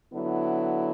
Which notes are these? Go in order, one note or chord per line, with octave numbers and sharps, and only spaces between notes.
D3 F#3 B3 E4